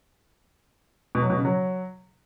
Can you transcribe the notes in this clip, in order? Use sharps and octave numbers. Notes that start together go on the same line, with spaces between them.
B2
F#3
B2
C#3
F#3